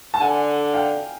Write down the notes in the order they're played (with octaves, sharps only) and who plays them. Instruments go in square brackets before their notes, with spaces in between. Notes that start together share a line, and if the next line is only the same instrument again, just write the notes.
[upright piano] A5
[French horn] D3 [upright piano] F#5 G#5
[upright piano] F5 G5